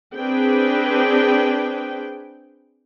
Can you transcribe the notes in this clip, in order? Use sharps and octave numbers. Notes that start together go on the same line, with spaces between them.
C4 D4 G#4 B4 G5